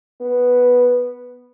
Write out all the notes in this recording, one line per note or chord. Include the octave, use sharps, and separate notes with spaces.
B3